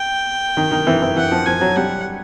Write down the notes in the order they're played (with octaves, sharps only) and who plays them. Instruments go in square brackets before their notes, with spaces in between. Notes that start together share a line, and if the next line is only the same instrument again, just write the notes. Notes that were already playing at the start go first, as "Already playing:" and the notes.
Already playing: [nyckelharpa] G5
[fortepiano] D#3
D#3
E3
E3
[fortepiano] E3 [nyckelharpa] F#5
[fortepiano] F3
[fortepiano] F3 [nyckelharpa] G#5
[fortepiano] F#3
[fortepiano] G3 [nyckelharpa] F#5